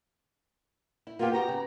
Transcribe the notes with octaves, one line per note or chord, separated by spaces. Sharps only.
E4
A#3 B3 F4 G4
B3 F#4 G4 A#5
C#3